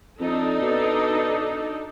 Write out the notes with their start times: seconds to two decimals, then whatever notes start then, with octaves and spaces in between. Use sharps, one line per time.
0.20 F2 D4 D#4 A4
0.62 B2